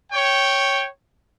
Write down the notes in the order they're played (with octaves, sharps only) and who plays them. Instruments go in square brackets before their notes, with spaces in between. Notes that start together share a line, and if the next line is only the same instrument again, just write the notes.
[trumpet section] C#5 G5